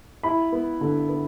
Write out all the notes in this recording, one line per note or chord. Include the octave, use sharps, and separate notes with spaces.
E4 B5
B3
D3
B3